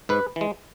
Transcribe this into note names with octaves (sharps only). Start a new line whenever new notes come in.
G#2 B4
E3 G#3